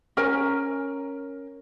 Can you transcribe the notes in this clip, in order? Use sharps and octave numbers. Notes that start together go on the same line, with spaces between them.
C#4 A#4 G#5